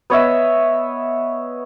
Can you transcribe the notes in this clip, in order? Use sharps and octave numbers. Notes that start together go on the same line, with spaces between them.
B3 C#5 D#5 E5